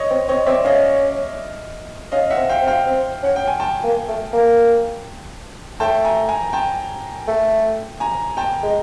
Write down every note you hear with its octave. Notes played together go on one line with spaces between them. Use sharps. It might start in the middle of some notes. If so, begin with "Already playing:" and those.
Already playing: C#5 D#5
C4
C4 C#5 D#5
C4 D5 E5
C#4 D#5 F5
C#4 D#5 F5
E5 F#5
C4
F5 G5
C4
F5 G5
C4
C#4 F#5
G5
G#5
G5 A5
A#3
A3
A#3
A3 G5 A5
G#5 A#5
G#5 A#5
G5 A5
A3
G#5 A#5
G5 A5
G#3